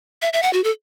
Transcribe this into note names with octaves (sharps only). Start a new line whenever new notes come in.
E5
E5
F#5
F#4
A4